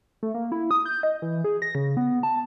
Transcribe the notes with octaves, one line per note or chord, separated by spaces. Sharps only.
A3
A#3
E4
D#6
G6
D#5
E3
G#4
A#6
C#3
B3
A5